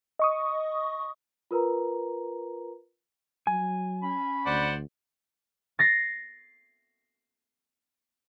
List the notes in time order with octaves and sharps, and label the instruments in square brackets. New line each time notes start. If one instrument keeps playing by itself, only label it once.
[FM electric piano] D#5 C#6 D#6
[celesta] F4 A#4 B4 A#5
[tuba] F#3 [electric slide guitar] G#5
[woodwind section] C#4 B5
[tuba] D2 [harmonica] C5 D5 F#5
[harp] A6 A#6 C7